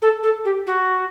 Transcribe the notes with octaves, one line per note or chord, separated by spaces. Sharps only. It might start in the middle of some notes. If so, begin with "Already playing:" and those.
A4
A4
G4
F#4